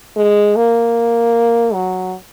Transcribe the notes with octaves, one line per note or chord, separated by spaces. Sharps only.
G#3
A#3
F#3